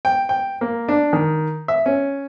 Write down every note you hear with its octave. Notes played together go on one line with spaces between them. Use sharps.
G5
G5
A#3
D4
D#3
E5
C#4